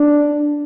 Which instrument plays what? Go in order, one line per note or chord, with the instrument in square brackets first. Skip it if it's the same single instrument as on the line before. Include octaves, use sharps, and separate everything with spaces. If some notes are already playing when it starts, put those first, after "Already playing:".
Already playing: [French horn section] D4